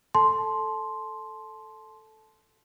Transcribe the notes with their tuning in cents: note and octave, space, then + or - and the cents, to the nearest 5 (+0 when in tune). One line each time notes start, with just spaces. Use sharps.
A4 +0 A5 -25 C6 +0